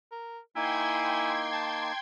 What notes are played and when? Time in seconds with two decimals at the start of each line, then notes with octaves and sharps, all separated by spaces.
0.11 A#4
0.56 A#3 D#4 E4 G5 G#5 C6 G#6
1.52 A5